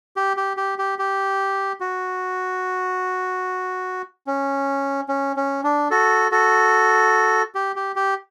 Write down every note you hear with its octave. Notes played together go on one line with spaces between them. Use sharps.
G4
G4
G4
G4
G4
F#4
C#4
C#4
C#4
D4
F#4 A4
F#4 A4
G4
G4
G4